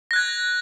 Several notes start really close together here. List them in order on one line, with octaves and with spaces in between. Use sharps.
A#6 F#6 G#6